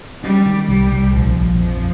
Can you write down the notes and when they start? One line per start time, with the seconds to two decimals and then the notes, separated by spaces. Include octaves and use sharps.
0.23 G3 C#4
0.46 D#3
0.68 C2 G3
0.92 C2
1.14 A#1 F3
1.38 A#1
1.60 F2 F3